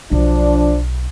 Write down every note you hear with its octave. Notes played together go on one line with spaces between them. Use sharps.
B1 F3 D4